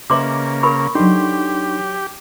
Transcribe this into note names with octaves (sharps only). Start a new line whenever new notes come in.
C#3 A#3 B4 D#5 E5 C6 D6
A#4 B5 C#6
F#3 D4 D#4 G4 A4 C6